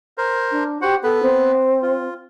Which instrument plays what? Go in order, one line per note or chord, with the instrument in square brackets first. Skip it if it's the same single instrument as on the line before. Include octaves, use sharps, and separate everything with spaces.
[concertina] A#4 C5
[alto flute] D4
[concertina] F#4 C5 F#5 [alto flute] G4
[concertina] B3 B4 [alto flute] A4
[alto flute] C4
[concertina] F4